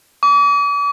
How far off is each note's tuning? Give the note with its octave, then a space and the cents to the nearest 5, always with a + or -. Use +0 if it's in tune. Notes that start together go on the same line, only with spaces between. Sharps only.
D6 -40